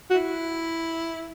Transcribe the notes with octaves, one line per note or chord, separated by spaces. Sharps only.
F#4
E4